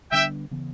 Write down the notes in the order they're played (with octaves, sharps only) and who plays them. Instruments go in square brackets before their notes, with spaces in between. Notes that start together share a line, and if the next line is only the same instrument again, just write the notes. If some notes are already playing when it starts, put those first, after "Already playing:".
[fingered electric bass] D3 G3 B3 D4 [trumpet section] E5 G5
[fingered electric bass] C#3 E3 B3